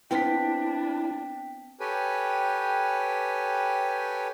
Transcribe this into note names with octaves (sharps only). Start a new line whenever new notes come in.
B3 C4 D4 E4 F4 G5 B6
G4 A4 B4 C#5 G5 G#5